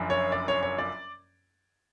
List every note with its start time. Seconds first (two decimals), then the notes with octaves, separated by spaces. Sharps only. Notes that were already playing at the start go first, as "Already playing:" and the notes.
Already playing: F#1 F#2 F3 D4
0.10 C#5
0.32 D5
0.48 C#5
0.63 C#5
0.78 D5